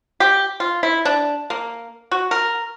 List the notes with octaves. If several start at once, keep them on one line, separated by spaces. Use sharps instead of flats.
G4
F4
E4
D4
A#3
F#4
A#4